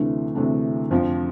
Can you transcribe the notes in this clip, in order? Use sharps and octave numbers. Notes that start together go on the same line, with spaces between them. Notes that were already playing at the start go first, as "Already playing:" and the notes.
Already playing: D2 C3 E3 A3 D4
D2 C3 E3 A3 D4
F2 D3 F3